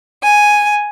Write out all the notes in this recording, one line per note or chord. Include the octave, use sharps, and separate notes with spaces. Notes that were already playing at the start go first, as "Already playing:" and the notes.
G#5